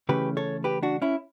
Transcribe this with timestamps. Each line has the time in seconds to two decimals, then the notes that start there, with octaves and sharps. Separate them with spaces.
0.09 C#3 E3 A3 C#4 G4 B4
0.37 A4 C#5
0.64 G4 B4
0.83 D4 F#4
1.02 C#4 E4